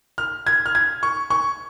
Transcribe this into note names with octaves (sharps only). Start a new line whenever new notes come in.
F6
G#6
F6
G#6
C#6
C#6